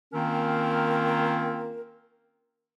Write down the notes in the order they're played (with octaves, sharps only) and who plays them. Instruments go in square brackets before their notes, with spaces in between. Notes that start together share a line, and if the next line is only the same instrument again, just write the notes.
[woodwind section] D#3 A#3 C4 C#4 F4 A#4